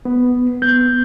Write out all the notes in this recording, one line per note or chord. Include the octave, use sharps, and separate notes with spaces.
B3
B3 G6